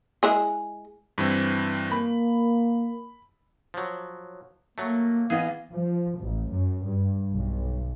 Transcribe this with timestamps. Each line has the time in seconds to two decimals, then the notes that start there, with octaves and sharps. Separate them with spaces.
0.23 G#3 E4 G#4
1.18 G2 E3 C4
1.92 A#3 B5
3.74 F3 F#3
4.78 F#3 A3 A#3
5.30 E3 B3 G#4 D#5 F5
5.73 F3
6.20 A1
6.51 F#2
6.87 G2
7.35 B1